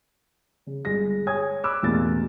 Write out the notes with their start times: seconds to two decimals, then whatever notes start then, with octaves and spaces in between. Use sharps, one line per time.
0.67 C#3
0.85 G1 G#3 A#6
1.26 G#4 C#5 G#5 D#6 G#6
1.64 B5 D6 E6 F#6
1.83 A1 E2 B2 A#3 A6